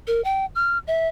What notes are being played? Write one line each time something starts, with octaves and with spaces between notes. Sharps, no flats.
A#4
G5
F6
E5